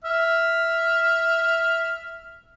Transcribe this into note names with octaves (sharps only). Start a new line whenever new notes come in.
E5 F6